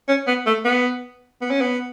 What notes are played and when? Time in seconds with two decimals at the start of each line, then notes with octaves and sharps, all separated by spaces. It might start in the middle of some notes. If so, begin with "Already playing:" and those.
0.08 C#4
0.27 B3
0.46 A3
0.65 B3
1.41 B3
1.50 C#4
1.61 B3